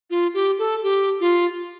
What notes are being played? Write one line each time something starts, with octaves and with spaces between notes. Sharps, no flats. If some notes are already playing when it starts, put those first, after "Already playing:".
F4
G4
A4
G4
F4